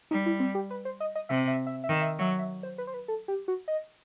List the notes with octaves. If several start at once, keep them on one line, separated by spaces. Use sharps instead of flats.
G3 D#4
E4
C4
G4
B4
C5
D#5
D#5
C3 E5
E5
E5
E5
D#3
E5
F#3 E5
E5
C5
B4
C5
B4
A4
G4
F#4
D#5